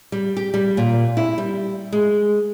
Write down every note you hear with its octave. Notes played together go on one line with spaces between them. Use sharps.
G3
G4
G3
A#2
E4
G3
G#3